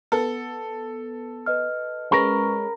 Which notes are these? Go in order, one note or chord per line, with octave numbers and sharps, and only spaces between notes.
B3 A4
B4 D#5 F6
G#3 C#4 A#4 B4 A#5 B5 C#6